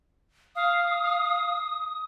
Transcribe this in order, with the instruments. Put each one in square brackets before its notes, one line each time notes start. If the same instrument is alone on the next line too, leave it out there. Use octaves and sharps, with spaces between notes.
[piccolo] F5 [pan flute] D#6